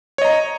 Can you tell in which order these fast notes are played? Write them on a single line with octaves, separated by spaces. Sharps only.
C#5 D#5 A#5